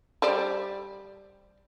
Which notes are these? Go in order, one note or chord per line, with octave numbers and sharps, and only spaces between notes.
G3 C5 D5